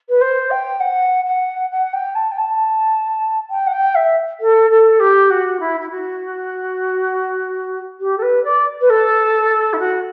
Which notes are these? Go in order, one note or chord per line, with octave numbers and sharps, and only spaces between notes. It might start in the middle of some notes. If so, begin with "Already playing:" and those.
B4
C5
G5
F#5
F#5
F#5
G5
A5
G5
A5
G5
F#5
G5
E5
A4
A4
G4
F#4
E4
E4
F#4
G4
A4
B4
D5
B4
A4
E4
F#4